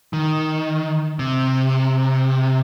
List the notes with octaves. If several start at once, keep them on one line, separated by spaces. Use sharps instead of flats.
D#3
C3